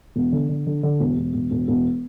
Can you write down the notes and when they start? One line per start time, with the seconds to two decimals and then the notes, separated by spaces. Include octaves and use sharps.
0.16 E1
0.32 D3
0.49 D3
0.67 D3
0.83 D3
1.00 E1
1.17 E1
1.34 E1
1.51 E1
1.68 E1